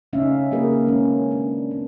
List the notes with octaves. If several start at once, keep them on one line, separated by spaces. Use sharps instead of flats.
C#3 A3 C#4 D#4 E5 F5
C#3 A#3 C4 G#4 A#4 B4
D#3 G#3 C#4
D4
C4